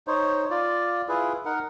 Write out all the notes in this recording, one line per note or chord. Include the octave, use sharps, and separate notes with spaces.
D#4 C5 C#5
F4 D5
E4 F4 G#4 B4
D#4 A#4 F#5